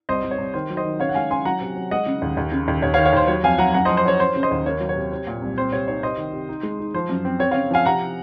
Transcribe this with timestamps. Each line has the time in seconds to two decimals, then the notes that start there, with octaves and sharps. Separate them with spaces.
0.09 C2 C5 D#5
0.24 C2
0.31 C#5
0.38 C2
0.54 D#3 C5
0.70 F#3
0.77 C5 D#5
0.85 D#3
1.00 C#3 C#5 F5
1.09 F#5
1.15 G#3 F5 G#5
1.31 C#4 G#5 C6
1.45 F#3 F#5 A#5
1.61 C3
1.76 F#3
1.91 G#3 D#5 F#5
2.06 C#3
2.22 D#2
2.37 D#2
2.52 C#3
2.68 D#2
2.82 D#2 C#5
2.94 C#5 F5
2.98 D#3
3.05 C#5 F5
3.13 D#2 C5
3.28 F#3 C#5
3.43 F2 F5 G#5
3.58 F#3 F#5 A#5
3.74 F#2 F#5 A#5
3.85 C5 D#5
3.89 F3
3.97 C5
4.05 C#4 C#5
4.20 C#4 C5
4.36 C#3
4.43 C5 D#5
4.51 D#2
4.66 A#3 C#5
4.80 F#3
4.89 C#5
4.96 C3
5.12 C4
5.27 A#2
5.42 C2
5.58 C4 C5
5.72 C3 C#5
5.88 D#4 C#5
6.03 C3 C5 D#5
6.18 D#3
6.33 C3
6.49 D#4
6.63 G#3
6.79 D#4
6.94 F3 C5
7.09 F#2
7.25 C4
7.39 C4 C#5
7.51 C#3 C#5 F5
7.71 F3 F5 G#5
7.85 C3 F#5 A#5